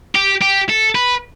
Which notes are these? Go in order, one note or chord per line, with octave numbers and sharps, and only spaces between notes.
G4
G4
A4
B4